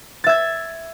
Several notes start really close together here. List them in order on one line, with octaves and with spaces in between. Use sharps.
A6 E5 G#6